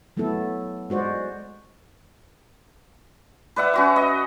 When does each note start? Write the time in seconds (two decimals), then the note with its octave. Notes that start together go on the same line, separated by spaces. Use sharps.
0.17 F#3 A3 B3 E4 A4
0.90 G#3 F#4 C5 D5
3.56 B4 D5 E5 F#5
3.74 C#4 F#4 B4
3.96 D#5